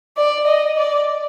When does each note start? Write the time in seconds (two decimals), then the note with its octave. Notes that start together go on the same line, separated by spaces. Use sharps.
0.17 D5
0.47 D#5
0.78 D5